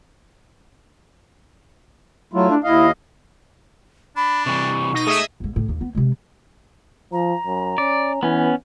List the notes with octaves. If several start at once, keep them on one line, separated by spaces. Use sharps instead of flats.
F#3 A3 E4 F4
D4
D#2 E4 D#5 F5
D4 B5
C3 E3 G3 C#6
B2 D#4 A#6
A3 G#4 D#5 E5 D#6
G1 G#2
A2
D#2 D#3
B3
C3 G#3
F3 A#5
F#2
C#4 D5
E3 B3 C#4